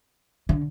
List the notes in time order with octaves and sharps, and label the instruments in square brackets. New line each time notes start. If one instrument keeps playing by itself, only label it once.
[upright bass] D3